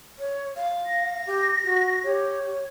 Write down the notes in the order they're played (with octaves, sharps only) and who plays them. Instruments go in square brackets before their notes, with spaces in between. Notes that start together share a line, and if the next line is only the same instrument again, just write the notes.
[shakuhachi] C#5
F5
[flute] A#6
[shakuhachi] G4
F#4
[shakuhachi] G4 [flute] C#5